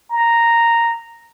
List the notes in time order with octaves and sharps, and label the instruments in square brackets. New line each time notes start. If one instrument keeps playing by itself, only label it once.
[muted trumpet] A#5